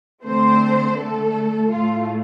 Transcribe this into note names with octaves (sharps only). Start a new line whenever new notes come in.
D3 A3 C4 C5
A3 A4
A2 A3 F4